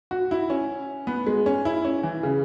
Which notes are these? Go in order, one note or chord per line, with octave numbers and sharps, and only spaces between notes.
F#4
E4
C#4
B3
G#3
C#4
E4
C#4
E3
C#3